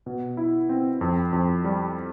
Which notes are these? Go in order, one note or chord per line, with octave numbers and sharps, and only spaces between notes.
B2
E4
C4
F2
F2
G3